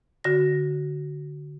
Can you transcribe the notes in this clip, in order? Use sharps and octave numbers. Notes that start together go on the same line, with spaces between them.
D3 F#4 A#6